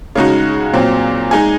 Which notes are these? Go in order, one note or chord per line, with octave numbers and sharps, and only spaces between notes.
C#3 G#3 D#4 F#4
A#2 F#3 C4
G#3 D#4 G#4